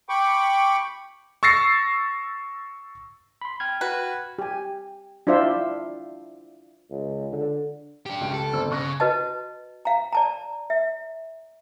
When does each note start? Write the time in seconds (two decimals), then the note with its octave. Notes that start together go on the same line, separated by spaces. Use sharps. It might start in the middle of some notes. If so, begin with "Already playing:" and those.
0.09 G5 B5 C#6 D6
1.43 C#6 E6 A6 A#6 C7 C#7
3.42 B5 C6
3.60 G5 F6 G#6
3.81 F#4 B4
4.39 G4 G#5
5.27 D4 E4 F4 C5 D5 E5
6.90 C#2
7.32 D3
8.06 D4 G4
8.21 C#2 D7
8.34 A4
8.53 G1 C4 E6
8.72 C#3 C#6 F#6 A#6
9.00 F#4 B4 D#5 A5
9.85 F5 A#5
10.13 D5 A5 A#5
10.70 E5